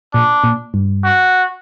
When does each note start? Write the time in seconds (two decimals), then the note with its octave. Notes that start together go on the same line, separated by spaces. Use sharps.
0.14 A#2 D4
0.44 A#2
0.74 G2
1.04 F#4